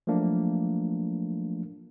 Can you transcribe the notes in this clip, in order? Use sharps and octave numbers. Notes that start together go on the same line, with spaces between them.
F3 F#3 A3 A#3 D4